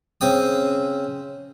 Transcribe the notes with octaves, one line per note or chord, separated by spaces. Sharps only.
C#3 C4 G5 D#6